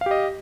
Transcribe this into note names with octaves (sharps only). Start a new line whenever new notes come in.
G4 D#5 F5